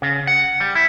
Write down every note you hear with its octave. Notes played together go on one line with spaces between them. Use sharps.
C#3
F#5
G3
E4